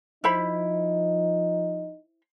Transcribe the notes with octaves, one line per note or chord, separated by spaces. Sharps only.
F3 D#4 E4 C5 B5